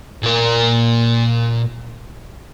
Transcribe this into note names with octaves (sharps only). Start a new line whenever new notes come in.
A#2 A#4